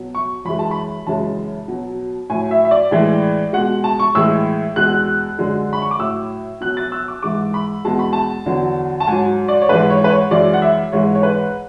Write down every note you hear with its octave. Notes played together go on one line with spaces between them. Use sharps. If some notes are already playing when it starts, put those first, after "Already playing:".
Already playing: B2 F#3
C#6
F#2 E3 G#3 B5
A5
B5
F#2 C#3 E3 G#3 A5
B2 F#3
A2 F#3 G#5
E5
E5
D5
A2 E3 G#3
B2 G#3 F#5
A5
C#6
A2 E3 G#3 E6
E2 B2 G#3 F#6
F#2 D3 G#3
B5
C#6
D6
A2 F#3 E6
B2 F#3 F#6
A6
E6
D6
G#2 E3 G#3 D6
B5
E2 B2 G#3 A5
B5
A5
E2 D3 F#3
A5
G#2 F#3 G#5
D5
C#5
G#2 E3 G#3 B4
C#5
B4
C#5
F#2 E3 G#3 D5
F#5
E5
G#2 E3 G#3 C#5
C#5
B4